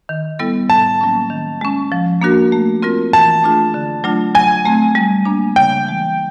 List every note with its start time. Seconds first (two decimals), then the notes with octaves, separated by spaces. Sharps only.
0.09 D#3
0.39 G3 B3 E4 A4
0.70 A2 A5
1.01 F#3 A#3 C#4
1.30 D#3
1.61 G#3 C#4
1.92 F3
2.22 A#3 D4 F#4 A#4
2.52 A3
2.82 C4 F4 A#4
3.13 E3 A5
3.44 A3 D4 F4 G#4
3.74 D3
4.04 F#3 A3 D4 F4
4.35 F#3 G#5
4.65 A3 C4
4.95 G3
5.25 A#3 D4
5.56 C#3 G5
5.87 E3 G#3